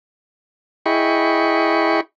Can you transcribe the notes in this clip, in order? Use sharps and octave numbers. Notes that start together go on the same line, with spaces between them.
E4 G#4 D#5 G5 B5 C#6